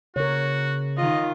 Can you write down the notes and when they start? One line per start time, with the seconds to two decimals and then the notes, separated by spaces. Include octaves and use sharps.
0.16 C#3 F#4 A#4 C#5
0.97 D#3 F4 D#5